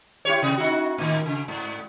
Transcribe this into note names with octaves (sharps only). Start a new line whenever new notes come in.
E4 G4 C#5
C3
D#4 E4 F#4
A2 D#3
C#3
G#2